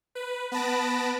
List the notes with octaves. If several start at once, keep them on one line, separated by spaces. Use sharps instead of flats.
B4
B3 B4 A5 B5 A#6 D7